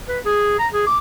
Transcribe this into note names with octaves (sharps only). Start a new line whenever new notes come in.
B4
G#4
A#5
G#4
D6